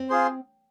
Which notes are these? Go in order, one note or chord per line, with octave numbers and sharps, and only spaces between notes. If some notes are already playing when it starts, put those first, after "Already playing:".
Already playing: C4
F4 G#4 C5